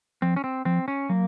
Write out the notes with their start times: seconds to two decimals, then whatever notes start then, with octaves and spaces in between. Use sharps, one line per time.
0.22 F3 C4
0.36 C#4
0.44 C4
0.65 F3 C4
0.88 C#4
1.09 F#3 A#3